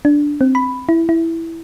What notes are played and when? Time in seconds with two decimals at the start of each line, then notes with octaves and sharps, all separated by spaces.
0.05 D4
0.41 C4
0.55 B5
0.89 E4
1.09 E4